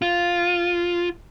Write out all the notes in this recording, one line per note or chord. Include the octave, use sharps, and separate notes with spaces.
F4